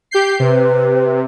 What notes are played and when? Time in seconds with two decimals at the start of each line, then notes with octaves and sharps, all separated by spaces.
0.11 G4 G6 C7
0.40 C3 B4